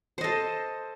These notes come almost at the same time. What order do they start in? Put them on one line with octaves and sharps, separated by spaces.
C5 D#5 A4